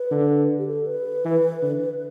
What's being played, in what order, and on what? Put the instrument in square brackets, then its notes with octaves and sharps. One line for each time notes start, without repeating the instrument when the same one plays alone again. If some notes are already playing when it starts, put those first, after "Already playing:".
Already playing: [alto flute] B4
[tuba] D3
[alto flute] G4
A4
B4
[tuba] E3
D3